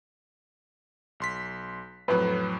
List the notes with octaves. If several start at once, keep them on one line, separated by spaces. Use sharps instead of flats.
B1 C6 B6
F2 A2 F#3 B4